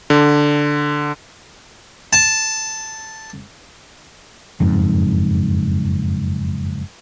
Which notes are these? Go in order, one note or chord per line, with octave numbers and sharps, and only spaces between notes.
D3
A5
F#1 F2 G#2